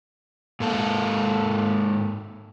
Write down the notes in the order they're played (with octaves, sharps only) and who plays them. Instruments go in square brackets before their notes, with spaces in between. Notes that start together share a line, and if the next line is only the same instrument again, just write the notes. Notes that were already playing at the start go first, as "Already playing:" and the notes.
[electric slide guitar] G#2 A#3 A4